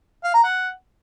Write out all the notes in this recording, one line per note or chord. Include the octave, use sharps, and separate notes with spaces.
F5
A#5
F#5